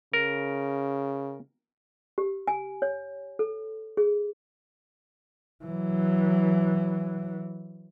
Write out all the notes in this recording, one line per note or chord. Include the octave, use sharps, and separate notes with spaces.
C#3 A#4
G4
G#5
C#5
A4
G#4
E3 F#3